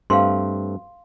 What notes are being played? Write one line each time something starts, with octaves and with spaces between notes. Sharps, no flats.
G2 A3 C4 F5 C6